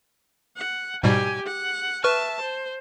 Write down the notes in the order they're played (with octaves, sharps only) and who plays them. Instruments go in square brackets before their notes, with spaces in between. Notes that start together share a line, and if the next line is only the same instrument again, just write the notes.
[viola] F#5
[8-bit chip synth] G#2 B2 G3 [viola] G4 G#5
[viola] F#5
[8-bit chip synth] B4 C#6 F6 [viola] E5 A5
[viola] C5